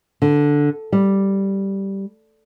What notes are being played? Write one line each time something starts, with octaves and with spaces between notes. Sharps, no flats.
D3
G3